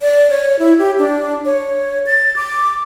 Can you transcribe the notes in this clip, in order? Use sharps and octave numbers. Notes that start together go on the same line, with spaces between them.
D5
C#5
E4
G4
D4
C#5
A6
D6